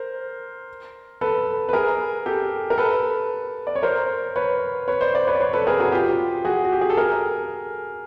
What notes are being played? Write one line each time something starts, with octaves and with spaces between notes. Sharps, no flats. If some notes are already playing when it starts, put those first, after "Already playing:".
Already playing: A#4 C5
A4 B4
B4
G#4 A#4
G4 A4
A#4
A4 B4
D5
C#5
A#4 C5
B4 C#5
B4 C#5
C5 D5
C5 D5
B4 C#5
D5
B4 C#5
A4 B4
G#4 A#4
F#4 G#4
F4 G4
F#4 G#4
F#4
G4
G#4
A4
G#4 A#4